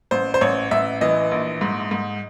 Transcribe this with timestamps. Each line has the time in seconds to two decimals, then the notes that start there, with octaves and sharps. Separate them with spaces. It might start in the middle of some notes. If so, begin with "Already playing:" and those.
0.11 A1 C5
0.34 C5
0.41 A1 C#5
0.71 A1 E5
1.01 E3 D#5
1.31 A#1
1.61 G#2
1.91 G#2